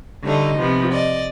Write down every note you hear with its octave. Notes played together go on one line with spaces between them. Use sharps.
D3 G3 A3 D#4
C3 F3 B3
D5 D#5